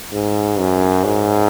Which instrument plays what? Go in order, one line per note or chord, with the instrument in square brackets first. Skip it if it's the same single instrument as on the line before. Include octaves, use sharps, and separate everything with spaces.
[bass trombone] G#2
F#2
G#2